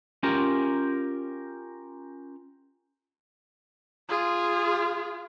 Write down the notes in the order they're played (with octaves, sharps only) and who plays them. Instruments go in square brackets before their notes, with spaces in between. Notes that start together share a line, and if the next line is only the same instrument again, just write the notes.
[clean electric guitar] C#4 F4 G4 A#4
[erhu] F4 [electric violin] G#4